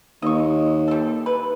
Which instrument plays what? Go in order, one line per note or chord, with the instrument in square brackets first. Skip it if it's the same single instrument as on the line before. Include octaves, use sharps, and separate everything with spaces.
[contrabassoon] D#2 [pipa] D#5 C#6
[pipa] G3 A4
B4